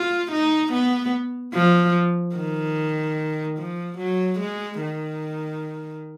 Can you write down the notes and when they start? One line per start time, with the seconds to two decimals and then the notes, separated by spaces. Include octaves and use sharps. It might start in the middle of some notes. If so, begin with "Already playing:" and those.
Already playing: F4
0.32 D#4
0.73 B3
1.54 F3
2.36 D#3
3.58 F3
3.98 F#3
4.39 G#3
4.81 D#3